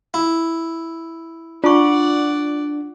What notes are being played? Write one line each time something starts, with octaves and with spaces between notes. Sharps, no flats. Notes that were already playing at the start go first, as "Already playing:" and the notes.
E4
D4 F4 D5 F#5 C#6